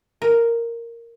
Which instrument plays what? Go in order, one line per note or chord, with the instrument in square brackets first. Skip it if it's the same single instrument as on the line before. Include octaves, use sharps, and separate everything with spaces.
[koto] A#4